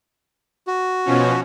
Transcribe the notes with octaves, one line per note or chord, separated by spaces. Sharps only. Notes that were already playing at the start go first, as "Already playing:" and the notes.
F#4
B2 F3 C#4